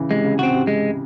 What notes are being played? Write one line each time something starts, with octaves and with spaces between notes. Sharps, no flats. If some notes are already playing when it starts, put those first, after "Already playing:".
Already playing: C#3 E3
C3 G#3
C#3
C#3 C4 F#4
C3
G#3